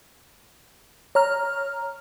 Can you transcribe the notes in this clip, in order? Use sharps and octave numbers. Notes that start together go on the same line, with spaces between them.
C#5 A#5 F6